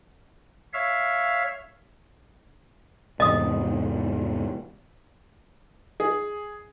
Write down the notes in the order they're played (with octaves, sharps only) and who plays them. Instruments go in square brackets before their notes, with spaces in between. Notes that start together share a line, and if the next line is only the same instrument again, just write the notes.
[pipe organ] C#5 E5 F5
[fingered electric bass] E2 G#2 C3 [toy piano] D#5 D#6
[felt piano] G#4